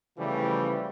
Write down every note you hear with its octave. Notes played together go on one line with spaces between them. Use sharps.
C#3 E3 F3 G3 A3